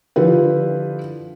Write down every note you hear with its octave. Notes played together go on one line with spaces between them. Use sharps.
D3 F3 E4 G4 B4